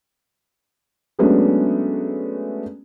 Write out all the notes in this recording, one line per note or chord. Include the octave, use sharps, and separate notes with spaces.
F#3 G#3 A3 B3 C#4 D4